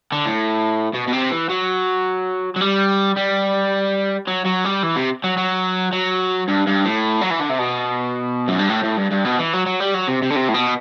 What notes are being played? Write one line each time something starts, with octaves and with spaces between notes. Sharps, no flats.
D3
A2
B2
B2
C3
E3
F#3
F#3
G3
G3
F#3
F#3
G3
E3
C3
F#3
F#3
F#3
G2
G2
A2
F#3
E3
D3
C3
B2
F#2
G2
A2
A2
G2
G2
B2
E3
F#3
F#3
G3
F#3
C3
C3
D3
C3
A2
B2